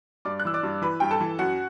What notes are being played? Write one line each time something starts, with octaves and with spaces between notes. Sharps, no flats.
G2 D5 D6
F#6
E3 E6
D5 D6
G2
E3 B4 B5
G2 G5
A4 A5
E3
F#2 F#4 F#5